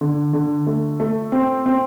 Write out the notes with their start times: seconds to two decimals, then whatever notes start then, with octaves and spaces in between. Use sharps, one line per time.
0.01 D3
0.33 D3
0.67 A3
1.00 A3
1.32 C4
1.66 C4